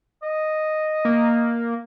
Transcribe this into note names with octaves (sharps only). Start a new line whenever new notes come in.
D#5
A#3